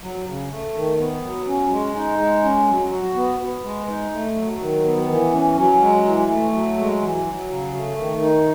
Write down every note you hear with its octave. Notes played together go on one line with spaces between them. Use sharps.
F#3
C#3
A3
D#3
B3
F#3
C#4
G#3
D#4
G#3
C#4
F#3
F#4
B3
B3
G#3
D#4
A3
F#3
D#3
B3
E3
C#4
F#3
G#3
E3
A3
F#3
G#3
E3
F#3
C#3
A3
D#3
D#4